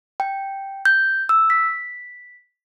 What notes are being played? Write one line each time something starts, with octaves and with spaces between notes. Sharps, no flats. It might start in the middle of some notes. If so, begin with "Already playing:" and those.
G5
G6
E6
B6